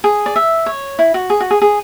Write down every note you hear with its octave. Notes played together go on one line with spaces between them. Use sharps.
G#4
D5
E5
C#5
E4
F#4
G#4
F#4
G#4
G#4